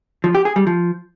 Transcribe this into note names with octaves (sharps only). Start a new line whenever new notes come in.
F3
G4
G#4
G3
F3